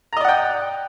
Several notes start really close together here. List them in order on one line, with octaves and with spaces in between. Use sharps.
A#5 D#5 D5 F#5 G5